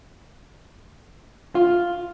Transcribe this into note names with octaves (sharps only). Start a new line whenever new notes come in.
F4